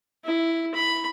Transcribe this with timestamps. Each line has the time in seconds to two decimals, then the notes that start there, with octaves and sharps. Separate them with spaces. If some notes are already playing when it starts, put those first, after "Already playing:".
0.25 E4
0.74 B5